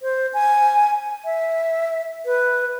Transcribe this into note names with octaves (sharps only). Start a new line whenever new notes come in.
C5
G#5
E5
B4